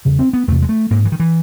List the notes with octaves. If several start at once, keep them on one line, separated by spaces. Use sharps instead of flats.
E2 C#3
C4
B3
E2 C3 A3
G#3
A3
G#2 A#3
E3
D#3
E3